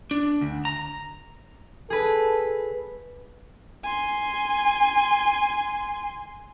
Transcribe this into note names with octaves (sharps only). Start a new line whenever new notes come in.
D4
D2
A#5
G#4 A4 B4
G#5 C6